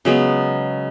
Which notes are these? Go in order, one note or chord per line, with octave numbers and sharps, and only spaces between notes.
C#3 F#3 G#3 B3